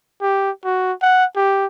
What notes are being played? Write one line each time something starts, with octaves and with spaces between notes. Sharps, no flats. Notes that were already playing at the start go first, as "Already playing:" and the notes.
G4
F#4
F#5
G4